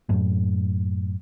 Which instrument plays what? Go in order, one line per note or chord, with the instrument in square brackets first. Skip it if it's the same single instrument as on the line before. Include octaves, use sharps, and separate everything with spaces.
[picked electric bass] F#2 A2